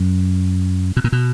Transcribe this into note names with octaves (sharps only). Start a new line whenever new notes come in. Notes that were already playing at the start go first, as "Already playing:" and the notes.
Already playing: F#2
B2
A#2
B2